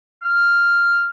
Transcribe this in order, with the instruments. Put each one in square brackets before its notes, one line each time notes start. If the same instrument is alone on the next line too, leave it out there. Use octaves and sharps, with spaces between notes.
[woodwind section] F6